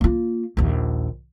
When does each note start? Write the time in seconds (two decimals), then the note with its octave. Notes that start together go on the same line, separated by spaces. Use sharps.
0.01 A#3 F4
0.57 A#1 D#2